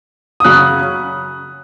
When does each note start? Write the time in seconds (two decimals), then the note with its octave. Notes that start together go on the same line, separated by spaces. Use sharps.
0.40 D#6
0.44 F#2 C#3 F#3 C#4 F#6